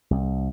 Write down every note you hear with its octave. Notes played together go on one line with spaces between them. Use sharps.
C2